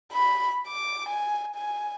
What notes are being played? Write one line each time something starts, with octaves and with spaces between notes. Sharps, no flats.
B5
D6
G#5
G#5